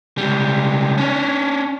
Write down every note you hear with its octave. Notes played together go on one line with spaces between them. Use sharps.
C#2 G3
C#4 D4